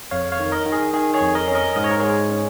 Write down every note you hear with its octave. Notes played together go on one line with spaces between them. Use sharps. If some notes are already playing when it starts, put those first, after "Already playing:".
F2 C#5 F5
C#5 F5
D#3
A#4 D#5
D#3
G#4
D#3 G#4
G#4 C#5
F2
A#4 D#5
C#4
A#4 D#5
G#2 D#5
C#5
A#4
G#3 G#4 C#5
C#4